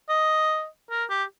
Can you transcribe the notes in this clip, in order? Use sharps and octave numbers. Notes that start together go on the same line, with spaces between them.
D#5
A#4
G4